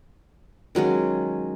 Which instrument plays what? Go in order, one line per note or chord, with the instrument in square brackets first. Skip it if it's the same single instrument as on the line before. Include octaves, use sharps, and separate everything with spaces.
[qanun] D#3 F#3 G#3 C#4